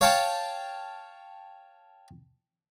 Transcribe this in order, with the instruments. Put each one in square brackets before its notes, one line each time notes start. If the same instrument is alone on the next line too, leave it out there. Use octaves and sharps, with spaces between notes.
[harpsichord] C#5 F5 G5 A5 C#6